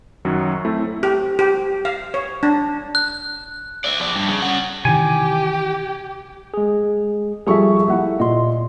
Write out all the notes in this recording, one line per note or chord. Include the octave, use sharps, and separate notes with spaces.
F#2 D#3 F#3 F#4
A3 C4 E4
G4
G4
F5
C#5
D4
F#6
D5 E5
F3 D5
G2
C#3
C#4 F#5
C3 D#3 E3 G4 G#5
G#3 G#4
F3 G3 G#4 A4 E5 C#6
A#3 E4 E5 F#5
A#2 D#5 C6